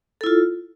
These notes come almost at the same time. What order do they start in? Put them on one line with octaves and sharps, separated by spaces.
A4 E4 F4